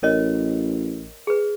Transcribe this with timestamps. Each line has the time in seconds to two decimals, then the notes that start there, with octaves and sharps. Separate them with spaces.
0.03 A1 A#4 C#5 D#5
1.27 G#4 B4